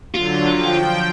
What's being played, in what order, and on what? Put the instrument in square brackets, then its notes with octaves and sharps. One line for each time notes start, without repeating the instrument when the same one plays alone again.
[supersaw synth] D3 F#3 [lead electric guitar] F4
[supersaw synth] F3 G5